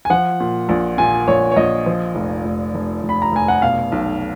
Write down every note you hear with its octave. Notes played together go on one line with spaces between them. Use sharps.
G#5
F3 F#5
A#2
A#1
A#2 G#5
A#1 C#5
C#5
A#1 D#5
F3
F1
F1
F1
F1
B5
A#5
F1 G#5
F#5
B2 F5
B1